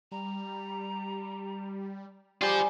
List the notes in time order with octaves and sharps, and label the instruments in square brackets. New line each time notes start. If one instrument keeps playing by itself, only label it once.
[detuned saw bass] G3 [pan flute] A#5
[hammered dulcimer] G3 G#4 [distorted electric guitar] F4 C5 [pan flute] G4